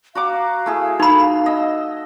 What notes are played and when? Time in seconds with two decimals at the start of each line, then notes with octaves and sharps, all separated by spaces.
0.15 F#4 F5 A#5 D6
0.66 A3 E4 G#4
1.00 D#4 A4 B5
1.46 D#5 E6